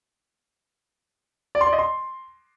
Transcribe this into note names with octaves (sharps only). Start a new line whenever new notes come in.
D5
C6
D5
D#5
C6